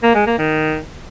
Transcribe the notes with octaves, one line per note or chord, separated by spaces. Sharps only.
A#3
G#3
A#3
D#3